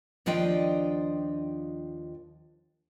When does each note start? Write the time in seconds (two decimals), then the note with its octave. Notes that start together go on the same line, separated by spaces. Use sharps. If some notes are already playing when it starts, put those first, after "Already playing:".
0.26 D#2 F3 D4 F4 D#5 G5